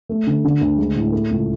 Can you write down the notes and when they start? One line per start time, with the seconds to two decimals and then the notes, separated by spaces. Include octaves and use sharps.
0.09 A3
0.27 D3
0.45 D3
0.61 D2
0.78 G#3
0.96 A2
1.12 A3
1.31 C#2